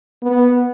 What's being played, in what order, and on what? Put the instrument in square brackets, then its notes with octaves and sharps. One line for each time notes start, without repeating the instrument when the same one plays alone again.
[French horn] B3